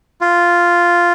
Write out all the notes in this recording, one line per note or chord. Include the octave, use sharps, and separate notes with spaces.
F4